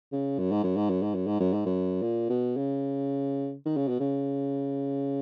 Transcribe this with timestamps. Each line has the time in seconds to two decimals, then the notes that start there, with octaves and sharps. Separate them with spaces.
0.12 C#3
0.39 F#2
0.52 G#2
0.64 F#2
0.77 G#2
0.90 F#2
1.03 G#2
1.15 F#2
1.27 G#2
1.40 F#2
1.53 G#2
1.66 F#2
2.02 A#2
2.30 B2
2.57 C#3
3.66 D#3
3.77 C#3
3.88 B2
4.00 C#3